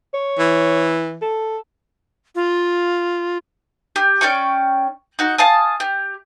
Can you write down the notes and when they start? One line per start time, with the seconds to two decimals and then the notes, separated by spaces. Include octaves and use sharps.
0.14 C#5
0.39 E3
1.22 A4
2.35 F4
3.96 G4
4.21 C#4 D5 G5 C#6
5.19 D#4 F#4
5.38 F5 G#5 A5 D#6
5.80 G4